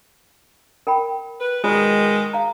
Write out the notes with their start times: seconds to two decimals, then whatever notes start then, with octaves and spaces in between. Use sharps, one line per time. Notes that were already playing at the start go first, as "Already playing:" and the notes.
0.87 A#4 G5 B5
1.40 B4
1.64 B2 D#3 G#3 F4 C#5
2.33 F5 A#5